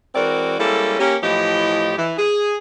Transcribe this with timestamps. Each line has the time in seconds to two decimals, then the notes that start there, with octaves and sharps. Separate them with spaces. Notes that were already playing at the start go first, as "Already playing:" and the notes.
0.15 E3 G#3 C4 F#4 A#4 D5
0.59 G3 G#3 A#3 C#4 E4 A4
0.99 A#3 C#4 G4
1.22 A2 E3 F3 G4 D#5
1.97 E3
2.17 G#4